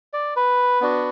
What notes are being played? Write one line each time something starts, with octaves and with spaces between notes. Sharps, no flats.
D5
B4
B3 D4 F#4